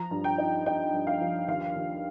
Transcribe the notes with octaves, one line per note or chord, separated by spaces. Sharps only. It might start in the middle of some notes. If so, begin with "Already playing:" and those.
Already playing: F3 A#5
G2
G5
D#4
D#4 G5
G2
F5
F3
D#2 F5
D#2